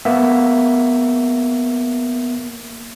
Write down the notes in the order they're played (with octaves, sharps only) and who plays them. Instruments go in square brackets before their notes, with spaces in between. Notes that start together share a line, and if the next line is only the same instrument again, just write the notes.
[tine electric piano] A#3 B3 E5